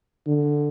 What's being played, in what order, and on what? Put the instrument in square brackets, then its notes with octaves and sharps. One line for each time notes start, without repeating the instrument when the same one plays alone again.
[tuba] D3